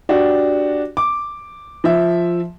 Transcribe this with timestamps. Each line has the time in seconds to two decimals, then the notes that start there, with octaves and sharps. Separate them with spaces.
0.09 D4 F#4 G4
0.97 D6
1.84 F3 E5